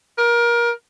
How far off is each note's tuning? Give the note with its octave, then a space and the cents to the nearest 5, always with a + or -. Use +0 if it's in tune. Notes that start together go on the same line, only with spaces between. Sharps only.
A#4 +25